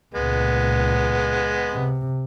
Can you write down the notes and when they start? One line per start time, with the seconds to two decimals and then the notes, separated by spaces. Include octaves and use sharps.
0.15 C#2 A#2 G#3 B3
1.71 C3